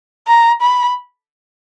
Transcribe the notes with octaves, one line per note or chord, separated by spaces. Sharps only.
A#5
B5